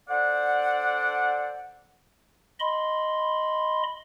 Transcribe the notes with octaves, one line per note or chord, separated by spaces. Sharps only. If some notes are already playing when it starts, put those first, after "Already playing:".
D4 A4 C5 D5 F#5
D#5 B5 C6